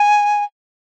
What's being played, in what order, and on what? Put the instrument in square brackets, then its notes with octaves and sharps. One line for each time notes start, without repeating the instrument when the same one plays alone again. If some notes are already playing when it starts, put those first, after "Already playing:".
Already playing: [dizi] G#5